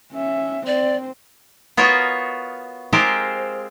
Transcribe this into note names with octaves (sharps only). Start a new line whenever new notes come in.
C#4 E5
C4 C5 D5
B3 F4 F#4 A#4 C#5 D#5
G#3 C4 F4 G4 A#4 C5